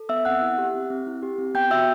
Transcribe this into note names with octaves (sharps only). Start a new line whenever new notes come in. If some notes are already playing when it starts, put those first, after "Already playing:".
Already playing: A4
B3 E5 E6
C4 F#5 F#6
E4
G4
C4
C4
E4
G4
C4
B3 G5 G6
F#4 E5 E6